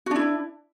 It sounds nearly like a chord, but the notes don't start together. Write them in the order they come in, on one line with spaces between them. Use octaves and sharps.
F#4 D4 E4